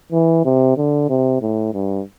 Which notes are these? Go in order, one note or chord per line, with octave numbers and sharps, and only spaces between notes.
E3
C3
D3
C3
A2
G2